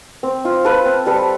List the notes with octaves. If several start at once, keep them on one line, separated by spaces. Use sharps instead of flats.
C4
F4
F4 A4 B4
C4
G3 A4 B4